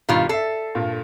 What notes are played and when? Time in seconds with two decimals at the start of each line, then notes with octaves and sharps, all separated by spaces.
0.09 B1 G2 D#3 G3 F4
0.29 A4 E5 C7
0.75 G2 A#2